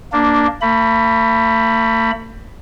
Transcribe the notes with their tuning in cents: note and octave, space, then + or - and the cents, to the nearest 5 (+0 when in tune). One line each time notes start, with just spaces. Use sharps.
A#3 +0 D4 +0
A3 +45 B5 +0